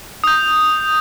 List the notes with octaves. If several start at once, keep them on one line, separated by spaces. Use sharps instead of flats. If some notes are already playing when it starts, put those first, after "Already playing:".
D#6 G6